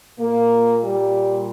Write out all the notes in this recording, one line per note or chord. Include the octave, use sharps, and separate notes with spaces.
A#2 A#3
G3